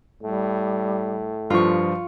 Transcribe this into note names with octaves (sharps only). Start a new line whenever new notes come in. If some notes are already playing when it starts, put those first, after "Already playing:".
A2 G3
G2 F3 F4 C#6